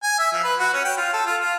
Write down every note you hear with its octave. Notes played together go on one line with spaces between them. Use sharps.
G#5
E5
F3
B4
F#4
C#4
G5
F4
A4
F4
F4